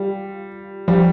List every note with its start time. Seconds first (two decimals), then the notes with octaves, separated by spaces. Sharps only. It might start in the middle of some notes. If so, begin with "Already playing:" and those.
Already playing: G3 F4
0.88 F3 G3